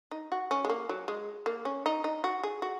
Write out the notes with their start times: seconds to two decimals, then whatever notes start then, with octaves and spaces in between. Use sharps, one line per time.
0.11 D#4
0.32 F#4
0.51 C#4
0.65 G#3
0.70 A#3
0.89 F#3
1.08 G#3
1.46 A#3
1.65 C#4
1.86 D#4
2.04 D#4
2.24 F#4
2.43 G#4
2.62 F#4